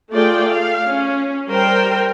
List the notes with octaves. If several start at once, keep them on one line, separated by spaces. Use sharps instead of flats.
A3 F4 G#4 D5 G5
F5
C#4
G3 A#4 C5 G5